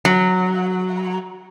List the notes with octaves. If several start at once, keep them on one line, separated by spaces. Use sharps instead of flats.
F#3